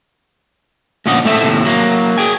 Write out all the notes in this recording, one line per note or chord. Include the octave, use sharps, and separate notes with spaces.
D2 A#2 F3 C#4 D#5 F#5
A2 A3 C4 E4 A4 E5
D#2 A2 C3
F#3 A#3
G#4 G5 G#5